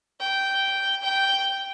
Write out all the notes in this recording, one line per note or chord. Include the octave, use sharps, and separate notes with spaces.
G5
G5